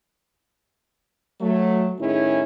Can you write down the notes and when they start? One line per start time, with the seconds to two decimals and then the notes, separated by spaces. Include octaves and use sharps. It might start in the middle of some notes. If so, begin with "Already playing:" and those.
1.41 F#3 A3
2.00 A2 D#3 C#4 D#4 E4 G#4